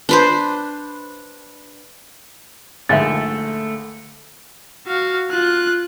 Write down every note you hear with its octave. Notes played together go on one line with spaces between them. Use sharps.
D4 B4 C5
A#1 G#2 D3 A3 E5 A6
F#4 F5
F4 F#6